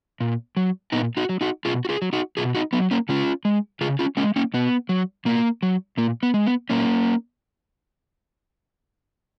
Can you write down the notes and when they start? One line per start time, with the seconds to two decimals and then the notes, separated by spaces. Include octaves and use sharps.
0.20 A#2
0.57 F#3
0.92 A#2 B3 D#4
1.17 D#4 F#4
1.29 F#3
1.41 D#4 F#4
1.65 B2 F4 G#4
1.85 F#4
1.89 F4 G#4
2.02 F#3
2.13 D#4 F#4
2.37 B2 F4 G#4
2.55 D#4 F#4
2.73 F#3 B3
2.91 A#3 C#4
3.09 C#3 C#4 F4
3.45 G#3
3.81 C#3 F4 G#4
3.99 C#4 F4
4.17 G#3 A#3 C#4
4.36 A#3 C#4
4.54 B2 B3
4.89 F#3
5.25 B2 A#3
5.63 F#3
5.97 A#2 A#3
6.23 B3
6.34 G#3
6.46 B3
6.70 A#2 A#3 C#4